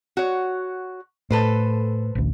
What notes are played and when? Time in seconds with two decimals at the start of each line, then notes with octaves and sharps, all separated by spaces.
0.17 F#4 C#5
1.31 A2 A4 B4 C5
2.15 A1 D2